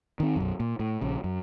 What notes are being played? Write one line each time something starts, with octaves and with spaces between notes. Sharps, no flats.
D#3 C4
B1 F#2
A#2
A2
A#1 C#3
F#2